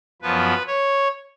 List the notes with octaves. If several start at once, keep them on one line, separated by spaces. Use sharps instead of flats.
F#2 F3 B3 B4
C#5